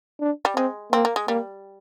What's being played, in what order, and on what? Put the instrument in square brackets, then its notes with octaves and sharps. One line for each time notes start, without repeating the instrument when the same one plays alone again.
[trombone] D4
[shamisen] G3
[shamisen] G#3 [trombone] C4
[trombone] A#3 [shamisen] C4
[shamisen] A#3
G#3
[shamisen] G3 [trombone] A#3